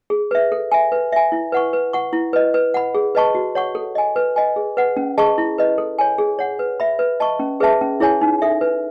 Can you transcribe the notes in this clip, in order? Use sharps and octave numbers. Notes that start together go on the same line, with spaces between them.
G#4
B4 E5
A4
E5 G#5
B4
E5 G#5
E4
B4 F#5 C#6
B4
F#5 C#6
E4
B4 D#5
B4
F#5 B5
G#4
B4 D#5 A5 C#6
F#4
C#5 F#5 C#6
A4
D#5 G#5
B4
D#5 G#5
G#4
B4 F#5
C#4
G#4 D#5 A5 C#6
E4
B4 D#5
A4
C#5 G#5
G#4
C#5 F#5
B4
E5 B5
B4
D#5 A5 C#6
C#4
G#4 B4 E5 A5
C#4
E4 G#4 C#5 G#5
D#4
A4 E5
B4